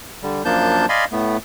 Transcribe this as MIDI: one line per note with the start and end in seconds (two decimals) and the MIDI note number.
0.23 0.43 50
0.23 0.43 55
0.45 0.86 42
0.45 0.86 53
0.45 0.86 58
0.45 0.86 62
0.45 0.86 81
0.45 0.86 91
0.89 1.05 74
0.89 1.05 75
0.89 1.05 77
0.89 1.05 80
0.89 1.05 83
0.89 1.05 84
1.12 1.37 45
1.12 1.37 57
1.12 1.37 59